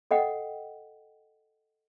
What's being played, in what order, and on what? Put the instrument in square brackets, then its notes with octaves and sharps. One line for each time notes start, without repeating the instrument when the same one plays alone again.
[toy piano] A4 D#5 F#5 G5